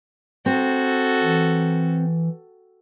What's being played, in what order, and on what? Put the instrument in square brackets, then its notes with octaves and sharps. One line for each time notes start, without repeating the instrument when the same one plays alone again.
[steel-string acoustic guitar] C4 [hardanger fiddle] F#4 A4
[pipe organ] E3